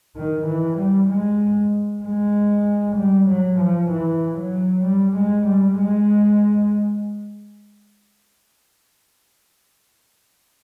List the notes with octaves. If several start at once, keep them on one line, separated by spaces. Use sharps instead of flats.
D#3
E3
G3
G#3
G#3
G3
F#3
F3
E3
F#3
G3
G#3
G3
G#3